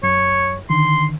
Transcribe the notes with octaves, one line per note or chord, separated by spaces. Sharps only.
F#2 C#5
D3 D#3 C6